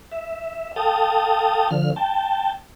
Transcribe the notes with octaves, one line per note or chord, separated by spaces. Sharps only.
E5
A4 F5 G5 A5 D#6
D3 F3 F6
G5 A5